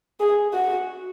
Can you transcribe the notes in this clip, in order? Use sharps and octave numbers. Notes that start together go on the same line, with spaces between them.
G#4
F#4